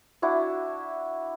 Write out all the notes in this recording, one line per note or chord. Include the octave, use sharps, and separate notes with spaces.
D4 E4 F#4